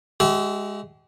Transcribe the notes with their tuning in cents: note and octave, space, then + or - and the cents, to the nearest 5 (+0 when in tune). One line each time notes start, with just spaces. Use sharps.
G#3 -5 G4 -45 E5 +0